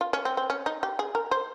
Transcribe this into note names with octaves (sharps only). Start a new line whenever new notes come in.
F4
C#4
C4
C4
C#4
D#4
G4
G#4
A#4
C5